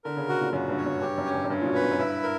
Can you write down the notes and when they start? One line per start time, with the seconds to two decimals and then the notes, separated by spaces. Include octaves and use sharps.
0.04 D3 A#4
0.17 C#3
0.28 B2 F#4
0.41 A#2
0.53 F#2 F#4
0.69 G2
0.78 C#5
0.85 F#2
1.01 G2 G4
1.18 F#2
1.26 C#4
1.34 G2
1.44 F#2
1.50 G2 C#4
1.62 A#2
1.66 B2
1.75 B4
1.83 A#2
1.91 F#2
1.99 G2 E4
2.23 A#4